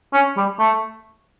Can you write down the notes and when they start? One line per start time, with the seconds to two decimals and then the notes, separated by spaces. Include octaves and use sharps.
0.13 C#4
0.37 G3
0.60 A3